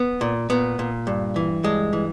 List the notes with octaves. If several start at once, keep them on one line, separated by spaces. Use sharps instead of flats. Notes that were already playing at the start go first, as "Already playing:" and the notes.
Already playing: B3
A#2
A#2 B3
A#2
G2
E3
G2 G#3
E3